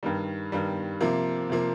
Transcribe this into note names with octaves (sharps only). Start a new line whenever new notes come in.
G2 D#3 G3
G2 D#3 G3
C3 F3 A#3
C3 F3 A#3